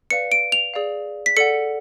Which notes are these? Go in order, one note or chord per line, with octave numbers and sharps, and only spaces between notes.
B4 D5 F5 C#7
D7
F7
G#4 D5 F5
B6
A4 D5 F#5 C#7